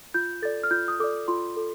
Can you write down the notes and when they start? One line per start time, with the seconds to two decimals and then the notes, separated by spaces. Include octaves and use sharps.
0.14 F4 G6
0.42 A4 D5 A6
0.63 F6
0.71 F4 G6
0.88 D#6
1.00 A4 D5 D6
1.28 F4 C6
1.57 A4